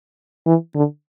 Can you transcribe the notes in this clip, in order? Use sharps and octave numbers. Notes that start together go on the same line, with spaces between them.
E3
D3